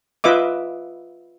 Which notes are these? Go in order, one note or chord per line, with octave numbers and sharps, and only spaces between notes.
F4 B4 D#5 E5 D6